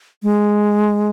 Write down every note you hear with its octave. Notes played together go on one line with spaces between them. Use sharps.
G#3